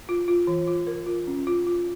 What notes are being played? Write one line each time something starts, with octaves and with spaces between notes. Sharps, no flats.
F4
F4
E3
F4
A#4
F4
C#4
F4
F4